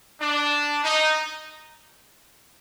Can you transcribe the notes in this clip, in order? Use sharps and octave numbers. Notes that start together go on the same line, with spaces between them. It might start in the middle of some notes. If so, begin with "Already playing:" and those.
D4
D#4